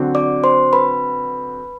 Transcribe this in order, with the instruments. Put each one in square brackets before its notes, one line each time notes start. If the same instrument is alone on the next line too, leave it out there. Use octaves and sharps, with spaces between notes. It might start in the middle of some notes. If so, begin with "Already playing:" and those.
Already playing: [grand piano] D3 F#3 C4 F#4
[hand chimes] D5 D6
C5 C6
B4 B5